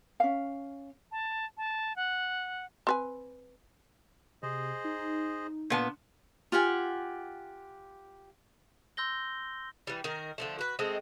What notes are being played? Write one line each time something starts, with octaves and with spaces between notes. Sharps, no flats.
C#4 F5
A5
A5
F#5
C4 B4 G#5
C3 G#4 C5 D#5
D#4
A#2 B3 D4 A5
F4 G4 F#5 G#5
C6 E6 G6 A#6 G7
E3 G3
D#3 A#4
D3 F3 A3
F#4 B4
G#3 A3 C4 D#5